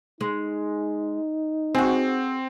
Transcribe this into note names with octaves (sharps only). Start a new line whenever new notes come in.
G#3 D#4
C4 F#4 G#4